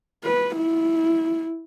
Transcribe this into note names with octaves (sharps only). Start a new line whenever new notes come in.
B4
E4